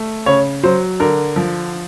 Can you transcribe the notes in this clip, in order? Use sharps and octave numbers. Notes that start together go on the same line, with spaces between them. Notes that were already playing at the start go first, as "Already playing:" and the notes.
Already playing: A3
C#3 C#5
F#3 C5
D3 A#4
F3